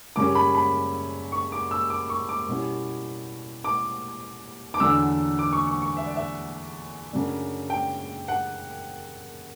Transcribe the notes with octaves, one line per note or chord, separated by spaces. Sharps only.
F#2 C#3 G3 C#4 D6
B5
B5
C#6
D6
E6
D6
C#6
D6
B2 G3 C#4 E4
D6
D6
E2 D3 F#3 A3 D4 E6
D6
C#6
C#6
C#6
E5
D5
E5
F#2 C#3 F#3 A3 D4
G5
F#5